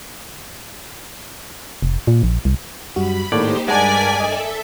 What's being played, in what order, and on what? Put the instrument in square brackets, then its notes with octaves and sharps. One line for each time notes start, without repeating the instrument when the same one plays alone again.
[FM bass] F1
A#2
A#1
C2
[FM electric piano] F#2 G3 F#4 [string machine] B5
[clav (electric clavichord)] G#1 A2 D5 [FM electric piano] A#3 [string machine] D#4 G4 C5
[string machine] G2 A#4 B6 [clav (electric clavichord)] G#3 [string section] D5 G#5 [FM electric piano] F#5 A5
[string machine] A4 E5 [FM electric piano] D#5